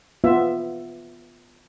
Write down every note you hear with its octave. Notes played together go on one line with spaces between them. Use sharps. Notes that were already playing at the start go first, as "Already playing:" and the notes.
B3 F4 E5